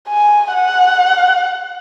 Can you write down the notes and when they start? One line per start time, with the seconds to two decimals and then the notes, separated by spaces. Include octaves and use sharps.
0.09 G#5
0.53 F#5